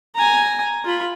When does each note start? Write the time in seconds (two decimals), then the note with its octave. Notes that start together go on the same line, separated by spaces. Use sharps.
0.15 G#5 A#5
0.84 F4 B5